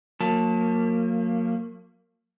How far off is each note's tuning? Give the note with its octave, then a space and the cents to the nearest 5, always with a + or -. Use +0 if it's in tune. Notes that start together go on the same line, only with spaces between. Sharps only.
F#3 -35 A#3 -20 A5 +0